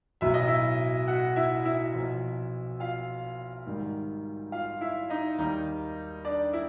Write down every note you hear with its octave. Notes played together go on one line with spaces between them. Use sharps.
B1 A2 F#3 E5
D#5
E4 E5
F#4 F#5
E4 E5
E4 E5
B1 A#2 F3
F4 F5
G#2 D#3 G3
F4 F5
E4 E5
D#4 D#5
D#2 D#3 G3 A#3 D#4
D4 D5
E4